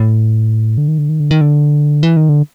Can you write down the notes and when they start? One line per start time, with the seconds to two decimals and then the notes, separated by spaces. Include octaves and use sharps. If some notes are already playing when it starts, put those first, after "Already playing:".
Already playing: A2
0.78 D3
0.88 D#3
0.98 D3
1.09 D#3
1.20 D3
1.31 D#3
1.41 D3
2.03 E3
2.17 D#3
2.29 D3